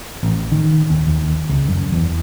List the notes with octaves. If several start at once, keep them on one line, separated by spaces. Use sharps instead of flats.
A1
D#3
D#2
D#2
C#2
F#2
E2